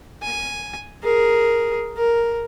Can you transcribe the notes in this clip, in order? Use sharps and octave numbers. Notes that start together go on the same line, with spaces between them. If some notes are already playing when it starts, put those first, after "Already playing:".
G#5
G#4 A#4
A#4